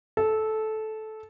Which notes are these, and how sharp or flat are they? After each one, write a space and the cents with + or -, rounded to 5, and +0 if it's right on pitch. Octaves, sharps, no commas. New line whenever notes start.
A4 -15